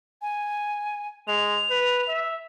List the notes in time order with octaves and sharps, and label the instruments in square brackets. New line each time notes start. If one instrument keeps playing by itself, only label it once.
[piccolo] G#5
[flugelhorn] G#3 [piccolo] F7
[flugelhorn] B4
E5